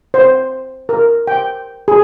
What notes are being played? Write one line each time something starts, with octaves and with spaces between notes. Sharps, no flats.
C5
A#4
G5
G#4